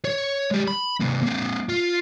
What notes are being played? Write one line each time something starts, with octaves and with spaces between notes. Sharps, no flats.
C#5
G#3 G4
B5
C3 A#3
A#3 C4
F4